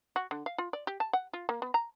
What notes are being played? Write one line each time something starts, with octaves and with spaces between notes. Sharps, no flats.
F#4
D3
F5
F4
D5
G4
A5
F#5
F4
A#3
B3
A#5